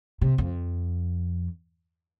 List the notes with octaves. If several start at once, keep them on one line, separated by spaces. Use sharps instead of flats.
C3
F2